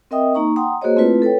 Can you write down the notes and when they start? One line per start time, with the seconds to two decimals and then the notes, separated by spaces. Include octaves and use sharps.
0.11 C4 A#4 D#5 E5 G5 D#6
0.34 A#3 D#4 A#5 C#6
0.56 F#5 G5 A#5 C6 D#6
0.82 A#3 F#4 G#4 C5 C#5 D#5
0.96 A3 C4 E4 F4 B4
1.22 A4 B4 C#5 G5